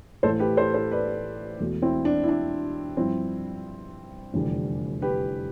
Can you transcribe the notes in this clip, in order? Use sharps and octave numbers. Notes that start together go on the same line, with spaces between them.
A1 A2 E3 A4 C5
G4 B4
A4 C5
A4 C5
B4 D5
E1 E2 B2 A3
C4 E4
D4
E4
D4
G2 F3 C4 E4
F1 E2 D3 G3
G4 B4